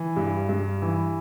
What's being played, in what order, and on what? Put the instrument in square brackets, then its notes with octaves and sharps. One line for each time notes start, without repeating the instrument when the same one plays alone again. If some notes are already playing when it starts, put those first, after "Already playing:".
Already playing: [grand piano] E3
G2
G2
E3